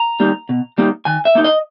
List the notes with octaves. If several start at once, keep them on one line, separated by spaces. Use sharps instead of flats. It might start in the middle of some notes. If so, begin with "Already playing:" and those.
Already playing: A#5
G3 A#3 D#4
B2
G3 A#3 D#4
D#3 G#5
E5
A#3 D#4
D#5